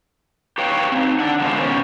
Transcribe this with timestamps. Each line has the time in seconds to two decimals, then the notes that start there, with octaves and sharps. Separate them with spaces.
0.58 G4 B4 C#5 F5 G5
0.92 C4 D#4
1.19 D4 F#5
1.40 D3 D#3 G#3 B3 F4 C5
1.59 B2 C#4